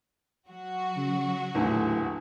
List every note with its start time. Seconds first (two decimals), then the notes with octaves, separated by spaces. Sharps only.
0.49 F#3 F#4
0.97 C#3
1.55 D#1 E2 A2 D3